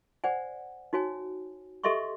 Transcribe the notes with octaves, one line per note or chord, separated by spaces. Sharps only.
C5 D5 F#5 G#5
D#4 F#4 C#5 G#5
G4 A4 D#5 E5 C6 C#6